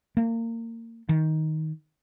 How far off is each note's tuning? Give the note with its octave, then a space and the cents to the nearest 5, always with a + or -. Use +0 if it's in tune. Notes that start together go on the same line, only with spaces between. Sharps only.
A#3 -30
D#3 +10